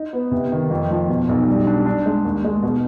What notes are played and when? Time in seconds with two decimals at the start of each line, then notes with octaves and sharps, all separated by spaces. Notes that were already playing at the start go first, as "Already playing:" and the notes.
Already playing: D#4
0.13 B3
0.31 C3
0.52 D#3
0.70 F2
0.90 F3
1.09 B2
1.29 B1
1.48 G3
1.67 D4
1.86 D4
2.06 G#3
2.25 D#2
2.44 G#3
2.63 B2